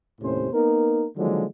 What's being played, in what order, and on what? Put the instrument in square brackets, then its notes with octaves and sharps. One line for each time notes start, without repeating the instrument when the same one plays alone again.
[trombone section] D#2 A2 C3 C#4 C5
A#3 B3 D#4 A#4
D3 D#3 F3 F#3 G#3 A#3